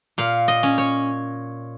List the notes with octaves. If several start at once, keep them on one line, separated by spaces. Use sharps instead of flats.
A#2 F5
D#5
C#4
C#5